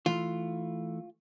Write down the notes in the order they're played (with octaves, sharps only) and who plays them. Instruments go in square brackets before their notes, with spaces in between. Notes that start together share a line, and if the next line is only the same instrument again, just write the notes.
[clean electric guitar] E3 A3 [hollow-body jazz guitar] F4